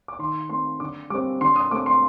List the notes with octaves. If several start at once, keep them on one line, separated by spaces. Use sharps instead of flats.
D6
D#3 C6
A3 C4 C6
D3 D6
G3 C4 D6
D3 C6
D#6
A3 C4 D6
C6